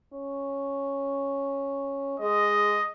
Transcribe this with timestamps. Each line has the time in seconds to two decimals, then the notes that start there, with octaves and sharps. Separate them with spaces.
0.13 C#4
2.20 G#3 D#5